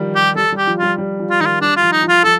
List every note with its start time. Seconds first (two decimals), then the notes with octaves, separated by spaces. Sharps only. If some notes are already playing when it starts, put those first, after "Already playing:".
Already playing: D#3 F3 G3
0.15 G4
0.35 G3 A4
0.52 G3
0.57 G4
0.67 F3
0.78 G3 F4
0.98 G3
1.20 F3
1.30 F4
1.40 D#3 D#4
1.46 F4
1.61 G3 D4
1.77 F4
1.82 F3
1.92 D#4
2.03 F3
2.09 F4
2.24 F3 A4